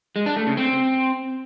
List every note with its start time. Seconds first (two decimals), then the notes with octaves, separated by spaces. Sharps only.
0.16 G#3
0.26 D4
0.36 A3
0.47 C#3
0.57 C4